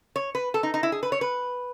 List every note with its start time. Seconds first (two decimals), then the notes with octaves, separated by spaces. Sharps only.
0.16 C#5
0.35 B4
0.54 A4
0.63 D#4
0.74 D#4
0.83 E4
0.92 G#4
1.03 B4
1.12 C#5
1.21 B4